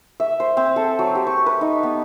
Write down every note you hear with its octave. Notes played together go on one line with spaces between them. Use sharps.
E5
C5
C4
A4
F#3
G4
C#6
B4
D#4
B3